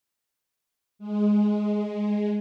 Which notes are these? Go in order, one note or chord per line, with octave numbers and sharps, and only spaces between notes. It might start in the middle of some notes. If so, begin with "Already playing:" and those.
G#3